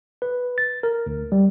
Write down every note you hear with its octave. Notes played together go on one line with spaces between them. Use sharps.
B4
A6
A#4
D2
G3